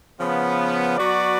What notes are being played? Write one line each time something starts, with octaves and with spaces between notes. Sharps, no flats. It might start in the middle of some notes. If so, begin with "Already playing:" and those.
C#3 F3 B3
F#3 B3 F#4 B4 D5